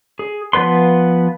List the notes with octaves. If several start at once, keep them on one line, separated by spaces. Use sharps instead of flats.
G#4
F3 B3 B4 C6